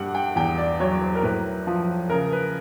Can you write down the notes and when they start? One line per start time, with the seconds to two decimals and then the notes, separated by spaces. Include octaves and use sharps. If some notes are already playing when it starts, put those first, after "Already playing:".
Already playing: G2 G3 F#5
0.15 G5
0.36 E2 G5
0.58 D5
0.80 F#3 C#5
1.01 C5
1.15 A#4
1.23 A2 B4
1.67 F3
2.10 C#3 A#4
2.32 B4